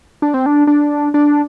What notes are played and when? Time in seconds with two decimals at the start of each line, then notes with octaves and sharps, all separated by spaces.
0.22 D4
0.34 C4
0.46 D4
0.67 D4
1.14 D4